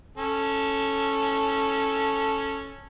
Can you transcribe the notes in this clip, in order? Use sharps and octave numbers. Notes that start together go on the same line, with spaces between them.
C#4 A4